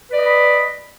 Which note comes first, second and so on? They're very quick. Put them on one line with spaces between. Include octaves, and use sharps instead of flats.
B4 D5 D#5 B5